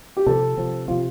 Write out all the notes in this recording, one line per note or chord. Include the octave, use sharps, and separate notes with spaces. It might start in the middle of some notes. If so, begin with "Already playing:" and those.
G4
C3 F3 C4 A4
C3 F3 C4
C3 F3 C4 F4